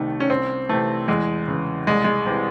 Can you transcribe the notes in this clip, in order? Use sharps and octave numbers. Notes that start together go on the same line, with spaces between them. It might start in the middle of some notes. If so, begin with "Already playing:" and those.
Already playing: C2 C3 D#3 A3
C#4
C2 C4
C3 E3 A3
E2 G#3
C#3 E3
C2 G#3
G#3
C3 E3